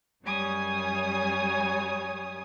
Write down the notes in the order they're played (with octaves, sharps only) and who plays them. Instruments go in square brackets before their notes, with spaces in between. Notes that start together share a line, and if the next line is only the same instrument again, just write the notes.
[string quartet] F#2 G3 C#5 G#5 D#6